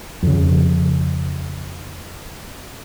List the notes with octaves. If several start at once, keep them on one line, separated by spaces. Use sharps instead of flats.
F2 C#3